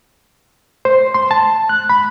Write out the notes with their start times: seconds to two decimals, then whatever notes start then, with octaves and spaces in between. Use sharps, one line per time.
0.85 C5
1.14 C6
1.31 A5
1.69 F#6
1.89 B5